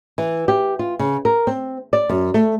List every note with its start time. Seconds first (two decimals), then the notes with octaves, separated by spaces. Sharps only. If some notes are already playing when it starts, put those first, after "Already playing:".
0.18 E3
0.48 G4
0.79 F4
0.99 C#3
1.25 A#4
1.47 C4
1.93 D5
2.09 F#2
2.34 A3